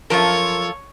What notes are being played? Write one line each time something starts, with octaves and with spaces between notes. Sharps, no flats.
F#2 F3 F4 A4 A#4 C#5